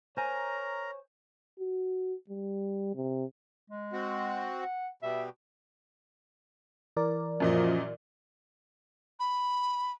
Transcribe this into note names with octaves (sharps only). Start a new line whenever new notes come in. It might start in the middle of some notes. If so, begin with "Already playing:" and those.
A#4 C5 C#5 G#5 A#5
F#4
G3
C3
G#3
C4 F#4
F#5
B2 G3 E5
E3 A#4 D5
F#2 A#2 F3 D#5
B5